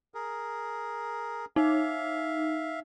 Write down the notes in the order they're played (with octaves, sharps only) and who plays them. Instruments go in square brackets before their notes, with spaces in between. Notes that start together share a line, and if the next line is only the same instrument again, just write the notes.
[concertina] G#4 A#4
[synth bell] D#4 [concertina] E5 F5